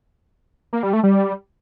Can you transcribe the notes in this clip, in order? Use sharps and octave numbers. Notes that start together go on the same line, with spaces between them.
A#3
G3
A3
G3